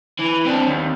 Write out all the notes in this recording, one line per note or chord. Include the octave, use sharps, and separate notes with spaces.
E3
C4 D4
D#2